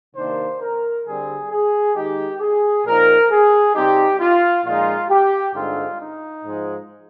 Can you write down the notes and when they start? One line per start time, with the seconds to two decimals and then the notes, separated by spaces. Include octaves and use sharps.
0.15 C3 D#3 A#3 D4 C5
0.61 A#4
1.05 D3 G3 C4 G#4
1.50 G#4
1.95 D#3 G#3 D#4 G4
2.40 G#4
2.85 A#2 F3 C4 D#4 A#4
3.30 G#4
3.74 C3 G3 C4 D#4 G4
4.19 F4
4.64 A#2 F3 G#3 D#4 F4
5.09 G4
5.54 G2 D3 G#3 C4 D#4 F4
5.99 D#4
6.44 G#2 F3 G#3